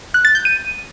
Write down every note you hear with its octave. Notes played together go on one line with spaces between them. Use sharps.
F#6
A6
G6
D#7